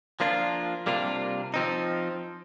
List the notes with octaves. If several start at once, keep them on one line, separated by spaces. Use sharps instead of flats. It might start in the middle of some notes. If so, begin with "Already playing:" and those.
F3 A#3 D4 F4
C3 G3 A#3 D4 F4
F3 C4 D#4